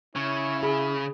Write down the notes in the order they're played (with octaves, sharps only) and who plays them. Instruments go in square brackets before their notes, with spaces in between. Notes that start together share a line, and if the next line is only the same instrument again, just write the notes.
[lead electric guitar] C#3 [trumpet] E4 [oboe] C#5
[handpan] G#4 [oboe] B5